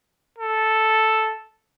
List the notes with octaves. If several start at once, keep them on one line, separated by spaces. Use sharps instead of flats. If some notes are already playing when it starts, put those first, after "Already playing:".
A4